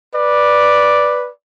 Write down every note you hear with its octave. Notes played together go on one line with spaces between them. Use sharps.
B4 D5